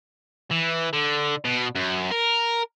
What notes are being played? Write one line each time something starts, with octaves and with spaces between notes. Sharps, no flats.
E3
D3
B2
F#2
A#4